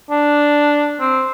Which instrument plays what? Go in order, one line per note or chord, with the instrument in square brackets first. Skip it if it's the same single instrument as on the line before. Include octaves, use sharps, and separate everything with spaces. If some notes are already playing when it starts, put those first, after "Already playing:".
[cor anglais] D4
C4